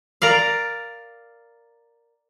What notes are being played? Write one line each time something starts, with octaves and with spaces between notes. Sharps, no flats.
A#4 D5 F5